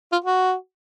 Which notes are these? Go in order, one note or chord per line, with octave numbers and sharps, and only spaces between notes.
F4
F#4